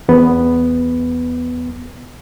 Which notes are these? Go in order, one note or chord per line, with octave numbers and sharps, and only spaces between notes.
E2 B3